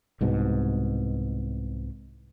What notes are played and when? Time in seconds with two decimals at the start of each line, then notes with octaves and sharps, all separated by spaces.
0.21 C2 G#2 B2